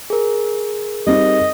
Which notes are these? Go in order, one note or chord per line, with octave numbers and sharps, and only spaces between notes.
G#4 A#4
G3 C4 D#4 D#5